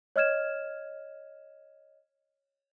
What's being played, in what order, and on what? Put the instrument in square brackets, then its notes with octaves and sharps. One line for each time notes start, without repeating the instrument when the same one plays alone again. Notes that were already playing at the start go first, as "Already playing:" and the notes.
[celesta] C#5 D#5 F6 G#6 E7